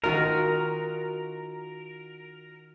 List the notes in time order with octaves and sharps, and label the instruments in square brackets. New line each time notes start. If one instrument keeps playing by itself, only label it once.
[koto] D#3 F4 [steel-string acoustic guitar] F#4 D#5 [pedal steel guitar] A#4